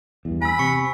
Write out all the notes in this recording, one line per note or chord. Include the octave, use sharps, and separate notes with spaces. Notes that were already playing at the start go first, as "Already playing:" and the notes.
E2 G2
G#5 B5 E6
C3 C#6 C#7